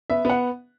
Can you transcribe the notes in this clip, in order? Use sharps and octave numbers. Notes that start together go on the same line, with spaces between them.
B3 E5
B3 F#5